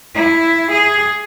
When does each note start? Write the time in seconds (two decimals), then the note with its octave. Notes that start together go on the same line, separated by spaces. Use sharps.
0.14 E4
0.71 G#4